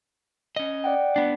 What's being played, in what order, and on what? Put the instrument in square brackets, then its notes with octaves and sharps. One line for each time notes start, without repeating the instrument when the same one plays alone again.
[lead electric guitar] C#4 D#5
[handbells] D5 F#5 G5
[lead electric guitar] B3 D4